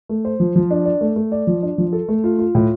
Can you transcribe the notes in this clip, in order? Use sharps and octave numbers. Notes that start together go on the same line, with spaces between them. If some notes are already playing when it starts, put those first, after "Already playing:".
A3
C5
F3
F3
D4
D5
A3
A3
D5
F3
D4
F3
A4
A3
F4
F4
A2